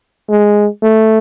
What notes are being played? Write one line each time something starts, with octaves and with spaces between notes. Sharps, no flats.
G#3
A3